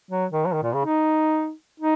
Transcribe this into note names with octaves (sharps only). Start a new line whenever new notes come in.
F#3
D#3
F#3
D#3
A#2
C#3
D#4
D#4